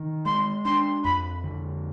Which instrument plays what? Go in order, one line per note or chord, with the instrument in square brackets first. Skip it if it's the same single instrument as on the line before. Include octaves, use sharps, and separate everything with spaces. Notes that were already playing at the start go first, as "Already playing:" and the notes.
Already playing: [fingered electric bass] D#3
[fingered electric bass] G#3 [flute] C6
[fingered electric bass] D4 [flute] C6
[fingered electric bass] F2 [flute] B5
[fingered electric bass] D3